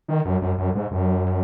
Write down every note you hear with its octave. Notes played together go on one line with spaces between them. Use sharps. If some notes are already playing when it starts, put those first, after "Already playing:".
D#3
F#2
F#2
F#2
G#2
F#2